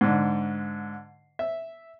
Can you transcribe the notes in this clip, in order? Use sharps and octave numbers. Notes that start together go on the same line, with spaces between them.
G#2 D3
E5